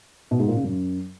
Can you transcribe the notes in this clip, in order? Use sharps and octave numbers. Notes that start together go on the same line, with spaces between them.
B2
G#2
A#2
C#3
F#2